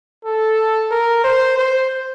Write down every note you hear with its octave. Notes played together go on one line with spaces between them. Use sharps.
A4
A#4
C5
C5